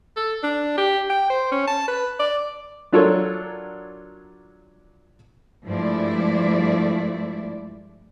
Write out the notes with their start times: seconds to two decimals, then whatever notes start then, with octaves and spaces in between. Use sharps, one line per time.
0.16 A4
0.43 D4
0.77 G4
1.10 G5
1.30 C5
1.52 C#4
1.68 A5
1.88 B4
2.19 D5
2.92 F#3 D4 F4 A4 A#4 C#5
5.67 G2 F3 G#3 A3 E4 D5